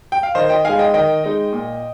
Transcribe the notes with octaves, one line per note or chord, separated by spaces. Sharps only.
G5
F5
D#3 C5 D#5
D#5 G5
G#3 D#4 F5 G#5
D#5 G5
D#3 D#5 G5
G#3 D#4
A#2